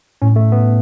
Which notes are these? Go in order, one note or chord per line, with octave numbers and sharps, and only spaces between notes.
A2 C#4
A3
B3